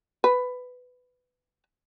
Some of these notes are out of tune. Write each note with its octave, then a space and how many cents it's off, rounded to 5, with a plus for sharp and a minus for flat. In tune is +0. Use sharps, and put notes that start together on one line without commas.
B4 +15